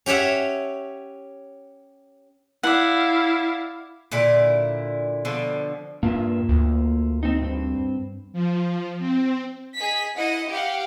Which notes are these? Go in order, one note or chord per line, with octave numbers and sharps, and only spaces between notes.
C#4 G4 C#5 E5 F#5
E4 D5 F5 F#5
A#2 D3 E4 D5
B2 D3 F3
G2 A#3 F4 E5
D2
C4 D#4
G2 C4
F3
C4
G#4 D#5 B6
E4 D#5 F#5
G4 F5 F#5